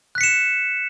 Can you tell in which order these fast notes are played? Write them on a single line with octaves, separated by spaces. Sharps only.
F#6 B6 C#7 E7